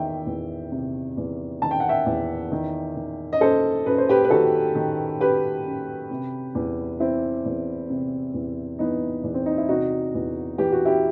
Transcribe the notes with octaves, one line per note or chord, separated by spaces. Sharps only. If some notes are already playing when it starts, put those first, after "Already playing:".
Already playing: E2 D#3 E5 G5
E2
C3
E2
D#3 A5
G5
F#5
E5 G5
E2
D#3
D#3
D#5
F#2 A4 C5
F#2 B4
C5
G4 B4
B4
D#3 F#4 A4
D#3
F#2 G4 B4
F#2
C3
E2
E3 C4 E4
E2
C3
E2
E3 B3 D#4
E2
C4
D#4
E4
C3 D#4 F#4
E2
E3 G4
F#4
E4 G4